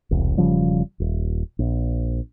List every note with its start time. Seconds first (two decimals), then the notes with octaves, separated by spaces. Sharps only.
0.11 E1 C2
0.37 E1 C#3 F3 G3
1.00 D#1
1.59 A#1